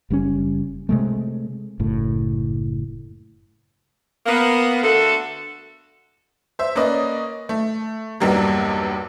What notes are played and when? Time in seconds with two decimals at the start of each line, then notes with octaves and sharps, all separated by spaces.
0.10 F#1 G3 C4 C#4
0.89 C3 G#3 A3
1.80 F#1 A2
4.26 A#3 B3
4.83 D3 A3 F#4 A4
6.59 C5 E5
6.75 A#3 C#4 B4 D5 D#5
7.49 A3
8.20 B1 E2 G2 G3 A#3